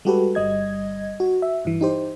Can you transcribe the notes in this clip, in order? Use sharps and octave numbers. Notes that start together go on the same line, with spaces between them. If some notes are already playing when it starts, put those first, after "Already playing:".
G3 G#3 F#4 G4 A4 B4
G1 G3 D#5 G#6
F#4
E5
G2 E3
D#4 G4 C5